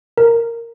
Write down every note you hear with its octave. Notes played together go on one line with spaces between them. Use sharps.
A#4